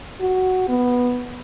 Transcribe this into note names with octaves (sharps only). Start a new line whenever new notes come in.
F#4
B3